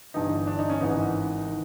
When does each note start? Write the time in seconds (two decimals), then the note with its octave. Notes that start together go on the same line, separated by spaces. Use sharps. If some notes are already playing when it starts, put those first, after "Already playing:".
0.14 G1 G2 E3 D#4
0.47 D4
0.59 D#4
0.70 C#4
0.81 G#1 G#2 E3 D#4
1.47 D#3